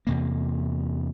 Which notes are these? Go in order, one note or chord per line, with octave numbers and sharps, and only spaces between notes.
E2 C3 A#3